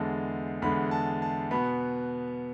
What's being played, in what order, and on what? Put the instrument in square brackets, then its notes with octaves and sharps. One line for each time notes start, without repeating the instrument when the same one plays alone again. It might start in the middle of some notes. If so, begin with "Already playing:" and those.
Already playing: [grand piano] E2 D3 G#3 A5
E2 D3 G#3 B5
A5
A5
B2 B3 B5